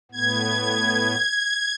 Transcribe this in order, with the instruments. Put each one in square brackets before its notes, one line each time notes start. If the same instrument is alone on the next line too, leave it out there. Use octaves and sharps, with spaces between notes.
[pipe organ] A2 B3 [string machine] G#6